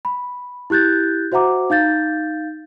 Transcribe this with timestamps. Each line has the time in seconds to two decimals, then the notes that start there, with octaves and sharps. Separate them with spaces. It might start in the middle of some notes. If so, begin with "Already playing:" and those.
0.05 B5
0.70 E4 G4 F#6 G6 A6
1.32 F#4 C5 E5 F#5 A#5 D6
1.70 D#4 F5 G6 A6